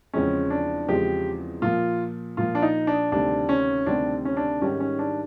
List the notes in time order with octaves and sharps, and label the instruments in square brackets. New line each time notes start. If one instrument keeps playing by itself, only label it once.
[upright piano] E2 C#3 F3 G#3 C4 [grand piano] C#4
[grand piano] D4
[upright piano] E2 C#3 F3 G#3 C4 [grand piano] G4
[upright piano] A#2 F3 A#3 [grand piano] F4
[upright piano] A#2 F3 A#3 [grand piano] F4
[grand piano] D4
D#4
D4
[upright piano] D2 C3 D#3 G3 C4 [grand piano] D4
[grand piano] C#4
[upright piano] D2 C3 D#3 G3 C4 [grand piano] D4
[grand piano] C#4
D4
[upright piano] G#2 D#3 G3 [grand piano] C#4
[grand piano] C#4
D4